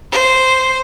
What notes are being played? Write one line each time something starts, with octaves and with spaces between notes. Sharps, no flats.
C5